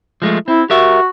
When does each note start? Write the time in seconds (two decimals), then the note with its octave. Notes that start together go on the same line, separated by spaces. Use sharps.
0.22 F3 G#3 A3
0.48 C4 E4
0.70 F#4 G4 A#4 E5